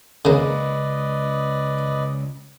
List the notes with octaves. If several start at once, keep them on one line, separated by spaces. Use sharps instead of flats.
C#2 C#3 A#3 B4 D5 D#5